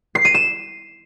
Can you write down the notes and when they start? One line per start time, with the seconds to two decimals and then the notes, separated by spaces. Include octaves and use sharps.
0.15 C7
0.25 D#7
0.34 E7